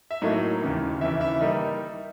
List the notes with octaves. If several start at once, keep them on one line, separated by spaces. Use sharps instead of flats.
E5
A2 F#3 A#3 D#4 D#5
D#2 C#3 E3
D#2 C#3 E3 E4 E5
E4 E5
D#3 G3 A#3 D#4 D#5